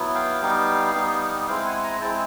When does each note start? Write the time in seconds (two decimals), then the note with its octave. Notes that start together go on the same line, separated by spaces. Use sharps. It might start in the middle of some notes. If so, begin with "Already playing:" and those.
Already playing: F#3 B3 E4
0.15 F5 G5
0.42 G3 B3 D#4
0.95 G3 B3 D#4
1.48 G#3 C4 E4 F5 G5
1.66 F#5 G#5
1.84 G#5 A#5
2.01 G#3 C4 E4 G5 A5